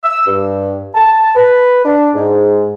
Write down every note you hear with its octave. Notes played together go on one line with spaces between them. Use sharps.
E6
G2
A5
B4
D4
G#2